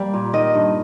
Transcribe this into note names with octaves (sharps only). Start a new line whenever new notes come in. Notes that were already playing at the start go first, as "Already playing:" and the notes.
Already playing: G3 A#3
A#2
D#3 D#5
G2